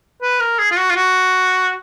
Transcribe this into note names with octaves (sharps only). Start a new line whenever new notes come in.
B4
A#4
G#4
F4
F#4
F4
F#4